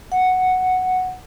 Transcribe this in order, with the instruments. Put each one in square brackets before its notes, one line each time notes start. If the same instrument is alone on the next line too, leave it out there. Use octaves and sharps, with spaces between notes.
[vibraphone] F#5